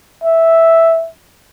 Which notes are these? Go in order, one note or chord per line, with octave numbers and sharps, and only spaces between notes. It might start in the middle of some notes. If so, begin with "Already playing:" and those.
E5